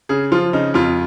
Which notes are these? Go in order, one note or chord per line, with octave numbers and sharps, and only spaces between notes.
C#3 G#4
F3 F4
C#3 D#4
F2 F4